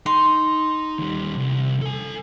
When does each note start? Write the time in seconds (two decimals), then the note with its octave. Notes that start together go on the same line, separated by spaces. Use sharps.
0.06 D#4 C6
0.99 D#2 G3
1.37 C2
1.82 A4 G#5